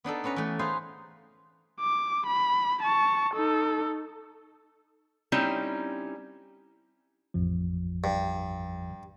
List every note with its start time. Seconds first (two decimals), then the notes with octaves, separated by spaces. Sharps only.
0.04 B3 D4 D#4 A4
0.24 B3 C#4 B4 A#5
0.36 E3 A3
0.59 D#4 G#4 B4 C5 F5
1.80 D6
2.27 B5
2.83 A5 C#6
3.34 D#4 A4
5.32 G3 C4 C#4 D#4 E4
7.34 A1 F2 F3
8.04 G2